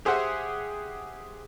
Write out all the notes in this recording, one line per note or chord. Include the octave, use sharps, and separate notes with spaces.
G4 G#4 C5 E5 F#5